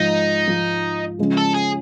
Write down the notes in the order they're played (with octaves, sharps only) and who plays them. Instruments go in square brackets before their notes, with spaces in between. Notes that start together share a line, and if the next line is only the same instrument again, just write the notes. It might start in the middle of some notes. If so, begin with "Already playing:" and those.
Already playing: [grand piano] G#2 F3 G#3 [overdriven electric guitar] D#4
[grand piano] G#2 F3 G#3
C#3 F3 G#3 C#4
[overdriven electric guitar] A4
G#4